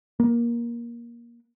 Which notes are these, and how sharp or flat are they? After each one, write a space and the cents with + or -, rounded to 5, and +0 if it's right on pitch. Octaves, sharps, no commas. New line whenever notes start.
A#3 +20